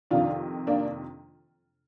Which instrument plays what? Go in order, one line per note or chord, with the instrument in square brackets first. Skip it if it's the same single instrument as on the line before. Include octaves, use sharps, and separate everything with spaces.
[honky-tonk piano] F2 C3 D#3 D4 F4
A#3 D4